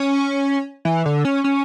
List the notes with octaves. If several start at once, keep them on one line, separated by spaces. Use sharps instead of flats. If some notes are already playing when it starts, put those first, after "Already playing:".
Already playing: C#4
E3
D3
C#4
C#4